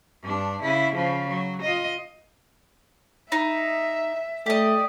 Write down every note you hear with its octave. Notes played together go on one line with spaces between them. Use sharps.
G2 D4
C#3 E4
C#3 F3
F#3
F4 D#5
D#4 E5
A3 G4 D5 D#5